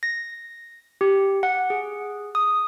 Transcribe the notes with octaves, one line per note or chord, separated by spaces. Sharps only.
A#6
G4
F#5
G#4
D#6